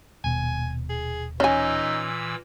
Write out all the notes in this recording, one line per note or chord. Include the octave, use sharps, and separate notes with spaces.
D#1 B2 G#5
G#4
A#2 E3 C#4 D#4 G#5 E6